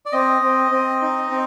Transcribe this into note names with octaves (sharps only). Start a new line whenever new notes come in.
D5
C4 D#5
C4
C4
D#4
C4